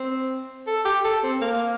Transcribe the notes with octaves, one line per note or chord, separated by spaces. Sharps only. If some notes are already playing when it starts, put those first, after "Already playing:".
Already playing: C4
A4
G4
A4
C4
A#3